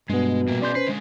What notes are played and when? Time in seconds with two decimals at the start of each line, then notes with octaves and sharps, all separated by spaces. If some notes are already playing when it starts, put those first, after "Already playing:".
0.09 G2 B2 G#3 B3
0.48 A#2 G3 A#3
0.62 C#4 G#4 B4 D5 C6 G6
0.75 C#4 B4 C5 C7
0.87 D3 G#3